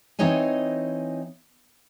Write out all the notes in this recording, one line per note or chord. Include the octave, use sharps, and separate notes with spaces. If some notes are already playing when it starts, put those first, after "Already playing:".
E3 C4 D#4 C#5 D#5 G#5